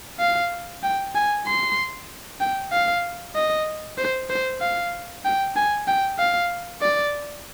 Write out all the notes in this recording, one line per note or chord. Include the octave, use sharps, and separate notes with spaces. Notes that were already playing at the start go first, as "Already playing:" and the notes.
F5
G5
G#5
C6
G5
F5
D#5
C5
C5
F5
G5
G#5
G5
F5
D5